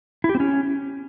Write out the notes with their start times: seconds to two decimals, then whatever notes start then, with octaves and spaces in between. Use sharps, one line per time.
0.24 E4
0.29 G4
0.35 C4
0.40 C#4